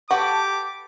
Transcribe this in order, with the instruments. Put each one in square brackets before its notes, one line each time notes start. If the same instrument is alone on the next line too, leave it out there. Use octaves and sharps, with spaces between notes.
[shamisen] F#4 [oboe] G4 [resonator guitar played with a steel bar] A4 B4 [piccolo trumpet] D6